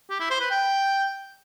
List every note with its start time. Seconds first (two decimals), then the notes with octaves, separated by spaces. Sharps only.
0.10 G4
0.20 E4
0.30 C5
0.40 B4
0.51 G5